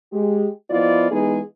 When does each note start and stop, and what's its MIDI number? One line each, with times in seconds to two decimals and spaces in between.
0.13 0.48 56
0.13 0.48 67
0.70 1.10 53
0.70 1.10 59
0.70 1.10 64
0.70 1.10 65
0.70 1.10 74
0.70 1.10 75
1.12 1.40 52
1.12 1.40 56
1.12 1.40 59
1.12 1.40 63
1.12 1.40 68